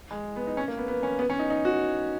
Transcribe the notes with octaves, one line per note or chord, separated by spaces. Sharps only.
G#3
B3
D#4
C#4
A#3
B3
B3
C#4
B3
C#4
D#4
D#4
F#4